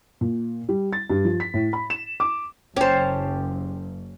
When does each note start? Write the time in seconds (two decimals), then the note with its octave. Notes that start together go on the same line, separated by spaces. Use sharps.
0.21 A#2
0.69 G3
0.93 A6
1.10 G2
1.25 F3
1.40 B6
1.54 A2
1.73 B5
1.90 E7
2.20 D6
2.76 F#1 C#4 G4 C5 A5